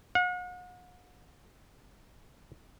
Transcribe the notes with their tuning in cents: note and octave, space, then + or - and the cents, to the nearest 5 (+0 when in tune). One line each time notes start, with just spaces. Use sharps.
F#5 -45